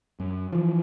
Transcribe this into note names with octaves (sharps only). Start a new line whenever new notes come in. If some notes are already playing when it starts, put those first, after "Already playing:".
F#2
E3 F3